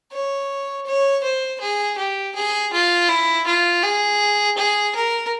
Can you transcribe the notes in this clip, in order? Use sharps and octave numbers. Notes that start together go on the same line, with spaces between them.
C#5
C#5
C5
G#4
G4
G#4
F4
E4
F4
G#4
G#4
A#4